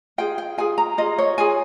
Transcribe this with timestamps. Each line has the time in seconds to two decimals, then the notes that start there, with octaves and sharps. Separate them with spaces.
0.18 F4 G#4 G5
0.38 G5
0.58 F4 G#4 G#5
0.78 A#5
0.98 F4 G#4 D#5
1.19 C#5
1.38 F4 G#4 G#5